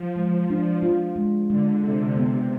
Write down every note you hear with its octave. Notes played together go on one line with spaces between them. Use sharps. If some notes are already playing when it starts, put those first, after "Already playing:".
Already playing: F3
G#3
D4
F4
G#3
D3 G#3
C3 D4
C3 B3